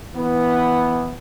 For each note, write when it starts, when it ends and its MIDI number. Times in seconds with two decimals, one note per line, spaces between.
0.15 1.12 52
0.15 1.12 59